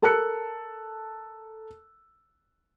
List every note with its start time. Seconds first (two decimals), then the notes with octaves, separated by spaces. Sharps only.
0.02 A4 A#4 A5 E6 F#6 C#7